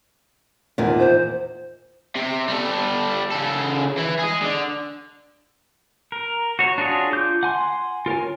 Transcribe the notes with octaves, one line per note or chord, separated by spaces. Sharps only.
E2 A#2 D#3
C5
C3
G3 A4
C#3 A4
E3 E4
G#4 D#5
D3
A#4
F#4 C#5
D4 F4 F#4 G#4 C#5
F4 D6 G6
F#5 G#5 C6
F4 A#4 C#5 G#5